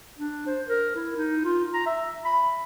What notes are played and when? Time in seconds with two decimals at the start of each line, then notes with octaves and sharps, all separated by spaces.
0.18 D4
0.47 C5
0.67 A#4
0.96 E4
1.17 D#4
1.45 F4
1.74 A#5
1.86 E5
2.25 B5